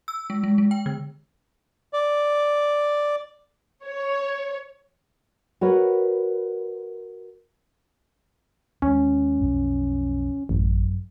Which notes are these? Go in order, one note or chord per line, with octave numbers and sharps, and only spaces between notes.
E6
G#3
G#3
G#3
G5
D3
D5
C#5
F#4 A#4 B4 C#5
D#2 G#3 C#4
B1 F2
A1 F#2